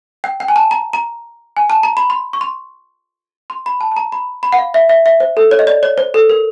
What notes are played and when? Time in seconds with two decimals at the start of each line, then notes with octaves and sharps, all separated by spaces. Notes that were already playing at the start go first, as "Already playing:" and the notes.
0.24 G5
0.40 G5
0.48 G#5
0.56 A5
0.71 A#5
0.93 A#5
1.57 G#5
1.70 A5
1.83 A#5
1.97 B5
2.10 C6
2.33 C#6
2.41 C6
3.50 C6
3.66 B5
3.81 A5
3.92 A5
3.97 A#5
4.12 B5
4.43 B5
4.53 F#5
4.58 F5
4.74 E5
4.89 E5
5.06 E5
5.20 C5
5.37 A4
5.51 C#5
5.59 D#5
5.67 D5
5.83 C#5
5.98 C5
6.14 A4
6.30 A#4